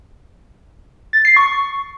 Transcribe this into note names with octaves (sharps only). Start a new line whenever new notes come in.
A6
C7
C#6